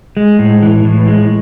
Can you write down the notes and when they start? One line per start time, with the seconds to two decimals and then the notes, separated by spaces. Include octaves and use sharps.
0.17 G#3
0.39 A2
0.62 E3
0.84 A2
1.08 G#3